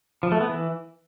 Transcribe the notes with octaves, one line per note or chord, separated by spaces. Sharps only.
F3
A3
B3
E3